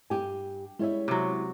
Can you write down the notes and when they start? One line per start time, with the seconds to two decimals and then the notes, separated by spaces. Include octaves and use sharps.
0.10 G2 G4 G#5
0.79 G3 G#3 C#4 E4 E5
1.08 C3 F#3